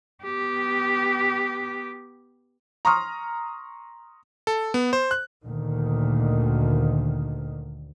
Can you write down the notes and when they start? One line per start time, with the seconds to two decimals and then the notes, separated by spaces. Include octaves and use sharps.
0.23 B3 G4
2.85 A#5 C6 C#6 D#6 F6
4.47 A4
4.74 B3
4.93 C5
5.11 F#6
5.45 D2 A#2 D#3